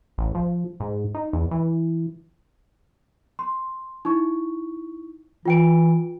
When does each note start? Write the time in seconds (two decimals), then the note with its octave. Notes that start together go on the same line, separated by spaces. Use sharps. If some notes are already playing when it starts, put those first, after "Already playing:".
0.18 A1
0.35 F3
0.80 G#2
1.15 D#4
1.33 E2
1.51 E3
3.39 C6
4.05 D#4 E4 C#6
5.45 E3 F4 G5 D7